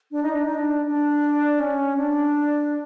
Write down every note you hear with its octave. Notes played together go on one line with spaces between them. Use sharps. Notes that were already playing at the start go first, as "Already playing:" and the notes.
D4
D#4
D4
D#4
D4
D4
C#4
D4